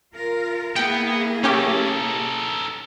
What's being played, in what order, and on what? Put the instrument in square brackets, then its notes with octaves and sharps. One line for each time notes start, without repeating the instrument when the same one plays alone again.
[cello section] F4 A#4
[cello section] A#3 E4 G#4 [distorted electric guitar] B3 [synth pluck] G5
[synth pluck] C#4 G4 [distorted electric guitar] D#4 A4